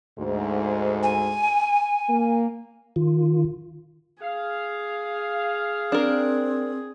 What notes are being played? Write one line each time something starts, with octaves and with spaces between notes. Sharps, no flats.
D2 G#2
G#5
A#3
D#3 F4
G#4 F5
C4 D4 A#4